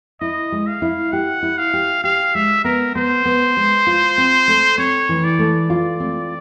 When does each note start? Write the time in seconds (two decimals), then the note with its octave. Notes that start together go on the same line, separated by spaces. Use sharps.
0.21 E4 D#5
0.52 G#3
0.67 F5
0.82 E4
1.12 G4 F#5
1.43 E4
1.58 F5
1.73 G4
2.04 G4 F5
2.35 G#3 E5
2.64 B3 A#4
2.95 B3 C5
3.25 B3
3.57 G#3
3.87 F4
4.18 C4
4.48 A3
4.78 C4 C#5
5.09 E3
5.24 D5
5.39 A3
5.70 F4
6.00 C4